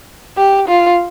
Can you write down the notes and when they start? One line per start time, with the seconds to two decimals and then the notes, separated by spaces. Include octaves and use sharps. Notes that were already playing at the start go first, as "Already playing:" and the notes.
0.37 G4
0.68 F4